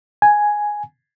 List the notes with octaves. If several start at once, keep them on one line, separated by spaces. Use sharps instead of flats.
G#5